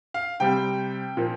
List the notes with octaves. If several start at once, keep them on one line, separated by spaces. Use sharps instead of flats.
F5
C3 G3 C4 G5
A#2 F3 A#3